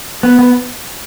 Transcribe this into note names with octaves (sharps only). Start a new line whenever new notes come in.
B3
B3